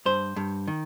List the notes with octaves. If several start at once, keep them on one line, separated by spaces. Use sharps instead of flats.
G2 C5
G2
D#3